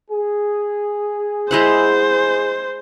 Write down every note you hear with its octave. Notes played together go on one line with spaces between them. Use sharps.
G#4
G#3 E4 C5 F#5